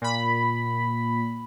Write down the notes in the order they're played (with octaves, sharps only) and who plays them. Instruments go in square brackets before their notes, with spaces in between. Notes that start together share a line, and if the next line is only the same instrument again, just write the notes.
[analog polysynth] A#2 B5